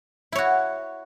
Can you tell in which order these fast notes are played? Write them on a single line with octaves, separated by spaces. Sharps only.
E4 C#5 F#4